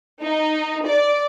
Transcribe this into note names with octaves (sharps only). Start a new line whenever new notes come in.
D#4
D5